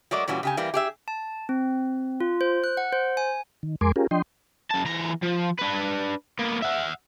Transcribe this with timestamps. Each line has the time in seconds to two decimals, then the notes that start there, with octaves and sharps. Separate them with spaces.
0.11 F#3 G#3 A3 F#4 A#4 D5
0.28 A#2 E3 G3 C#4 F#4
0.43 C#3 G4 G#5
0.57 E3 G3 A#3
0.74 G4 G#4 E5
1.08 A5
1.49 C4
2.21 F4
2.41 C5
2.64 F#6
2.77 F#5
2.93 C5
3.17 G#5
3.63 D#3
3.81 F2 G#3 A#4 G#5 C6 D6
3.96 C#4 F4 G4 G#4 A#4
4.11 F3 D4 D#5 G5 C6
4.71 F#2 A5
4.86 E2 A#5
5.23 F3
5.59 D4 B4
6.39 A#3 B3
6.62 E5 F#5